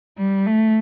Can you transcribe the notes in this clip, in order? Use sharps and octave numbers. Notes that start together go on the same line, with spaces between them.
G3
A3